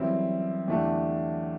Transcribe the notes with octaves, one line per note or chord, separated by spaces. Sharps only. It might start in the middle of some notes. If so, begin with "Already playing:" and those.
Already playing: F#2 E3 G3 C4 E4
E2 D3 A3 D4 G4